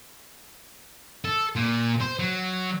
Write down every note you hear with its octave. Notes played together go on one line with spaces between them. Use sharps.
A4
A#2
C5
F#3